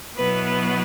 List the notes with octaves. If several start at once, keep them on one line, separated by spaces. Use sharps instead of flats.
B2 F#3 B3 E4 B4
B4